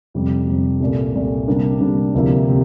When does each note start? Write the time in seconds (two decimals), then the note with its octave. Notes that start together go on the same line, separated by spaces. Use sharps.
0.14 F2 C3 G3
0.47 F2 C3 G3
0.80 C2 A#2 A3
1.15 C2 A#2 A3
1.48 C3 G3 A#3 D4
1.81 C3 G3 A#3 D4
2.14 D2 C3 F3 A#3 E4
2.49 C3